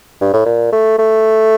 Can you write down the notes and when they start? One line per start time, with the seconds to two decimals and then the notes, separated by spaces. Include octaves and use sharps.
0.21 G2
0.34 A2
0.46 A#2
0.72 A3
0.99 A3